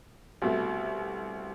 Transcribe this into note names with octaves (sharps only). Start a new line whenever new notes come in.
C2 B2 A3